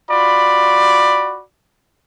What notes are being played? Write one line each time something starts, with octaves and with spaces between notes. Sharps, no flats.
F4 F#4 D5 B5